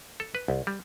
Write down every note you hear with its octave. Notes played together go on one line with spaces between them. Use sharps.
A4
B4
C2
G3